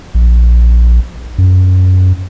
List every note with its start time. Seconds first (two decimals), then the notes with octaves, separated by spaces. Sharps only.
0.15 A#1
1.38 F#2